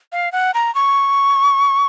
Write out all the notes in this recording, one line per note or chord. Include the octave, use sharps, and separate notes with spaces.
F5
F#5
A#5
C#6